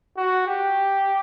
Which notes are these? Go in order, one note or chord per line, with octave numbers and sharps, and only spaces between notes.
F#4
G4